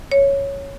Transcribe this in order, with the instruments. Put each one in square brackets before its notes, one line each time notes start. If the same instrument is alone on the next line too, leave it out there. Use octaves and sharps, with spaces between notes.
[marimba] C#5